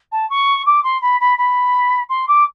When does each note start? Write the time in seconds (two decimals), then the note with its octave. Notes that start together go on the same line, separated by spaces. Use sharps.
0.12 A5
0.30 C#6
0.66 D6
0.84 C6
1.02 B5
1.20 B5
1.38 B5
2.09 C6
2.28 D6